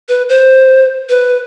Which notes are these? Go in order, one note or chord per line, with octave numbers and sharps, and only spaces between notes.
B4
C5
B4